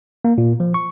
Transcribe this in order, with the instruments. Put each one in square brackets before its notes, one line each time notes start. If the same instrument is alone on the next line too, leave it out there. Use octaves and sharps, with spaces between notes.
[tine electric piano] A#3
A#2
F3
C#6